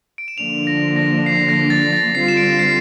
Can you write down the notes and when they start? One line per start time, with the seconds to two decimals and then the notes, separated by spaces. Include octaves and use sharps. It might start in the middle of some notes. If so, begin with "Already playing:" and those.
0.18 D7
0.28 E7
0.38 D3 F3 A#3 D4 F7
0.67 A#6
0.96 A#6
1.26 C7
1.49 A#6
1.70 A6
1.93 A6
2.15 D3 G3 C4 F4 C7
2.28 E7
2.37 D7
2.59 C7